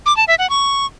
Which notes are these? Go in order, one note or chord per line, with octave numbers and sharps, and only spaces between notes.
D6
A5
E5
F#5
C#6